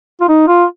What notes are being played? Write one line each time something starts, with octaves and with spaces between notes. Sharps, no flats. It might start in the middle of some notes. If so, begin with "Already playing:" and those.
F4
D#4
F4